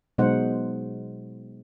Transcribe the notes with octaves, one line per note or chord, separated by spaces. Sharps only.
B2 F#3 G#3 D#4 C5 F#5